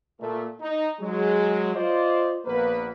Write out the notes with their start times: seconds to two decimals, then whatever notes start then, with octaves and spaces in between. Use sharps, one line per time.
0.19 A#2 A3
0.60 D#4
1.00 F#3 G#3
1.74 F4 C5 D5 D#5
2.45 A#1 A#3 B3 B4